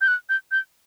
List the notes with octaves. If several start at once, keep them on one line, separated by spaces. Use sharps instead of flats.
G6
F#6
G6
G6